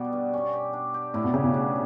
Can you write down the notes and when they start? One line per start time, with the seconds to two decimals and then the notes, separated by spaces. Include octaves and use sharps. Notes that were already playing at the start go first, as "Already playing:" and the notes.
Already playing: B2 G3 B3
0.13 G2
0.34 C#4
0.53 G4
0.73 D4
0.94 G4
1.14 A2 E4
1.24 B2
1.34 C#3 G4
1.44 B2
1.54 D4